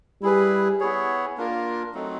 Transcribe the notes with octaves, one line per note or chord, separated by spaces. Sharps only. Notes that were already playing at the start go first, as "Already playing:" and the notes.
G3 E4 G#4 B4
B3 E4 G#4 C#5
A#3 D4 F4 A#4
F#3 A3 C4 D#4